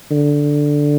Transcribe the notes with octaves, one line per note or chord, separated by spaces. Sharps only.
D3